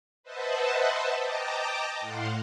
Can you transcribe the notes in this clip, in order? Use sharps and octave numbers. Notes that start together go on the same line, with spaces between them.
B4 C5 D#5 E5 F#5 A5
D#5 G5 A5 A#5 D6
A2 F5 F#5 C6